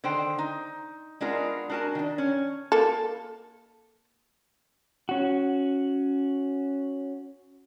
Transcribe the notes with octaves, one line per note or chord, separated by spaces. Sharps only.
D3 D#3 C5 G5
D#4
G#3 B3 D4 D#4 F4 A#4
D4 F#4 A#4 G#5 A5
D#3 D4
C#4
A#3 A4
C#4 F#4